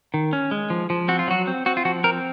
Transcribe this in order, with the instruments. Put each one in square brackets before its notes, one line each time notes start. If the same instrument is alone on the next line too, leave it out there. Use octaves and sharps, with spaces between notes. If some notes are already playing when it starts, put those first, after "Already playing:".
[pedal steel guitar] D#3
C#4
G#3
F3
F3
C4 F#4
F4
F#3 F#4
C4
C4 F#4
F4
F3 F#4
C4 A#4